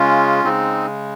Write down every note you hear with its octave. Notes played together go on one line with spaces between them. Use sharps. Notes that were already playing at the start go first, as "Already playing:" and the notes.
Already playing: C#3 G#3 C#4 F4
C#3 G#3 C4 D#4